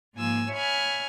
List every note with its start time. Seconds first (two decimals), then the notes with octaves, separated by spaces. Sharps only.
0.16 G#2 F3 A#3 G#5 E6
0.51 C#5 E5 G#5 B5 F6